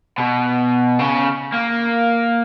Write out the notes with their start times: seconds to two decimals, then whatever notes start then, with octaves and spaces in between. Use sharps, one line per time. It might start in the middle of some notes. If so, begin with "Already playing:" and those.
0.18 B2
0.99 C#3
1.52 A#3